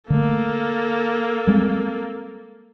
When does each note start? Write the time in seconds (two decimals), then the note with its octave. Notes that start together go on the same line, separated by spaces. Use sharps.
0.10 D3 A3 A#3 A4
1.47 G3 G#3 C4